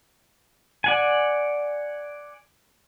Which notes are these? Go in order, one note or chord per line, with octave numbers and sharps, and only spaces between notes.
D5 F#5 G#5